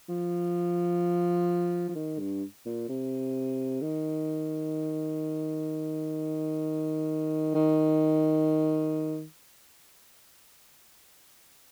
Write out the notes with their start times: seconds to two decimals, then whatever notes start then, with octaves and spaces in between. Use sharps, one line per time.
0.09 F3
1.89 F3
1.95 D#3
2.19 G2
2.65 A#2
2.89 C3
3.81 D#3
7.55 D#3